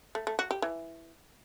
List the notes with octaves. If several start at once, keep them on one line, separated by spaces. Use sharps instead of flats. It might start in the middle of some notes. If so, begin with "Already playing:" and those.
A3
A3
F#4
G4
E3